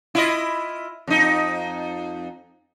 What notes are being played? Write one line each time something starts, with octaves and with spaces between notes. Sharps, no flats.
E4 F4 D#5
F2 D#4